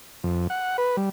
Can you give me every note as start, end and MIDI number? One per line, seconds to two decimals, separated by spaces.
0.24 0.47 41
0.50 0.77 78
0.78 0.96 71
0.97 1.09 55